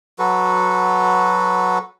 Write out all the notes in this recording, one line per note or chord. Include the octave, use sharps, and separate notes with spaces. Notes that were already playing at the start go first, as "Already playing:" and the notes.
F#3 F#4 A4 B4